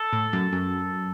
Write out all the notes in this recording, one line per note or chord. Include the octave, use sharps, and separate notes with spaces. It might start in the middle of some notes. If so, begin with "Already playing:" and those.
Already playing: A4
A2
F#2
F#2